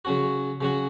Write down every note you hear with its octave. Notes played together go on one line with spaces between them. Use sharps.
C#3 F#3 C#4 F#4
C#3 F#3 C#4 F#4